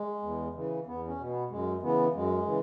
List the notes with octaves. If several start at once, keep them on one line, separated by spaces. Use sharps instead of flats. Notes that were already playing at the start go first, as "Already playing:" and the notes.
Already playing: G#3
E2
C#3 E3
E2 B3
C#4
B2
B3
F#2 G#3
C#3 E3 B3
F#2 G#3
C#3 E3